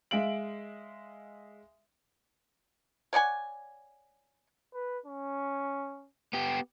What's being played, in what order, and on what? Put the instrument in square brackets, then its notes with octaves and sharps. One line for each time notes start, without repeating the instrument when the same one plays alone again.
[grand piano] G#3 E5 F5 D7 F#7
[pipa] C#5 D5 F#5 G#5
[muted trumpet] B4
C#4
[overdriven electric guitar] B3 G4